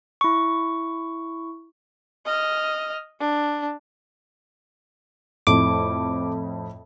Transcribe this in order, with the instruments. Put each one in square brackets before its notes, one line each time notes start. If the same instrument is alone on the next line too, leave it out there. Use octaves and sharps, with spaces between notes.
[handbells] E4 C#6
[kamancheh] D#5 F6
D4
[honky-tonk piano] F2 A2 [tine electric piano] D6